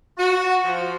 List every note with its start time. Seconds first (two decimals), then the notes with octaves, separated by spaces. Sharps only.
0.18 F#4
0.65 F3